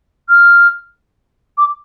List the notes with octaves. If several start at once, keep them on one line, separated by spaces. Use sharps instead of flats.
F6
D6